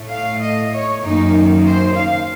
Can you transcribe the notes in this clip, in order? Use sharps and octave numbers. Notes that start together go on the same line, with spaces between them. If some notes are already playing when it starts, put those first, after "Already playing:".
Already playing: A2 A3
F5
D#5
C#5
F#2 D#3 A#3 D#4
C5
F5